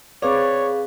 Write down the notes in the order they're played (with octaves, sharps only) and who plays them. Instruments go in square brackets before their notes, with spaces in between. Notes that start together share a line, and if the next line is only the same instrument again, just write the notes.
[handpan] C4 B4 D5 [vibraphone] G#4 F5 C#6 [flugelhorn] C#5